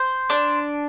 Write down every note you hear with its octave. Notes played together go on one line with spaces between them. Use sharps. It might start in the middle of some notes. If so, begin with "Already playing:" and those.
Already playing: C5
D4